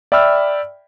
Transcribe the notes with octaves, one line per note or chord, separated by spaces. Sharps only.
D5 E5 G5 B5 E6 F6